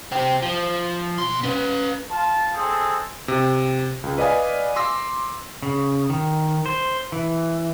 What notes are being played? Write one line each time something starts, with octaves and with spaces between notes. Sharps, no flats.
C4 G4
F3
B2 C6
C#4 B4
F4 A5
G#3 C4 G#4 A4
C3
C#2
B4 D5 D#5 F5 G#5
C6 D6 E6 A#6
C#3
D#3
C5
E3